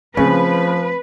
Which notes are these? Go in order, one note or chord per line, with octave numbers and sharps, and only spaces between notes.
C#3 F3 A3 C4 B4